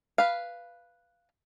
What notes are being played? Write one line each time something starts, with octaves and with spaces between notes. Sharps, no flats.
B4 F5